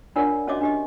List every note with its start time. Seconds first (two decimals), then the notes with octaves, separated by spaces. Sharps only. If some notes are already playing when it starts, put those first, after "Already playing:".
0.16 D4 F4 A#4 C#5 D5 F#5
0.47 C#4 F#4 C#5 D#5 E5 D6
0.61 D4 G4 D#5